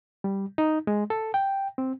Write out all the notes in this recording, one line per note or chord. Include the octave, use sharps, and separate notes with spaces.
G3
D#4
G#3
A4
G5
C4